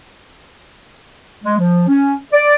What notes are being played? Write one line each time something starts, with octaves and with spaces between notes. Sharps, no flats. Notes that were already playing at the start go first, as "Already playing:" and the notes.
G#3
F3
C#4
D5